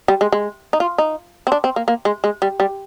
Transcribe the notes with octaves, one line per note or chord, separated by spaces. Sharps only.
G3
G#3
G#3
D#4
F4
D#4
C4
D4
C4
A#3
A#3
G#3
G#3
G3
G3